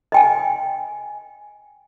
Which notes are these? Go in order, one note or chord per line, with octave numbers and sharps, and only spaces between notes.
D#5 G5 G#5